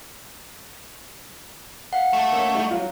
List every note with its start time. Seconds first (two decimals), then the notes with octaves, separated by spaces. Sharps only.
1.93 F5 F#5
2.13 A3
2.32 A#3 C#4 E5
2.55 G3 D#4
2.71 F#3 F4